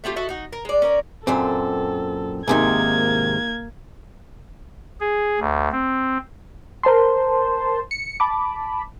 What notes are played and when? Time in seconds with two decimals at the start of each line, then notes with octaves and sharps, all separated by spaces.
0.04 A3 C4 F4 G4
0.16 F#4 A4 D#5 E5
0.29 D#4 F#4
0.52 A#4
0.65 G#3 D5
0.82 C#4 A#4 D5
1.27 F#2 A#2 C4 A4
2.48 G#2 C3 D#3 A#3 G#6
5.00 G#4
5.40 D2
5.72 C4
6.83 A#4 C5 A5 C6
7.91 C#7
8.20 A5 B5 D6